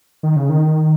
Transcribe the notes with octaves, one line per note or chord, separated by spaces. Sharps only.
D#3
C#3
D#3